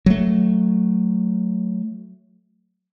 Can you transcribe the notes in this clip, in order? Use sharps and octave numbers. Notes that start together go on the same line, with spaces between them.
F#3 A3